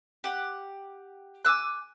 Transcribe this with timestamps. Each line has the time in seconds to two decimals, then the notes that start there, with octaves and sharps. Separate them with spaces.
0.24 G4 F#5
1.45 G#5 D6 E6 F#6